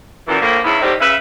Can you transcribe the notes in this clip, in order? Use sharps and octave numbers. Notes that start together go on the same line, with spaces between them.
F#2 A#2 E3
A2 D3 F3 A#3
E2 G#2 C#3 B3 E4
A2 D#3 G3 C4 D#4 G4
C#3 B4 E5